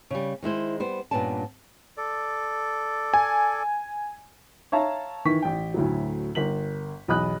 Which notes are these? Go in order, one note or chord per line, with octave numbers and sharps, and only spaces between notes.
C#3 G3
D#3 G#3 E4 C5
G3 B3 C5
G2 A#2 B3 C#4 D4 A5
A4 D5
G#5
C#5 E5 F5 A5 A#5
D#3 E3 C#6 B6
A1 G5
D2 A2 F#3
G1 A#4 B6 F#7
B1 E2 D#5 B5 D#6 F#6